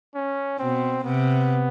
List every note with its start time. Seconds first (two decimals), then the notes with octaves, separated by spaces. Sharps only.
0.14 C#4
0.59 B2 C4
1.04 C3 B3